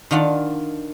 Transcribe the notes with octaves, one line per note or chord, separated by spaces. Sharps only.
D#3 D4 F4 F#5 A5